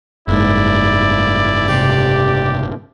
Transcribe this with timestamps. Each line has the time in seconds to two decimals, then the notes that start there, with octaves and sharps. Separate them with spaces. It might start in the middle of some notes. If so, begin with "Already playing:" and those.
0.28 F#1 G#2 E4 D5
1.68 C3 G4